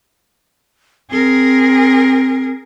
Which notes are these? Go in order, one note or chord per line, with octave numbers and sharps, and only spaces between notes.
C4 G#4 A#4